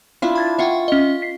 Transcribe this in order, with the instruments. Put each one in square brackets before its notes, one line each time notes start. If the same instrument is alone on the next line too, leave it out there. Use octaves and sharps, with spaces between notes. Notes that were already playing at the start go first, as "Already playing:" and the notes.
[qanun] D4 E4 F4
[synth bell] B5 G#6 A6
[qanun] F4 C6 C#6 [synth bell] E5 F#5 G5
[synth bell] C#4 D#5
B6 C7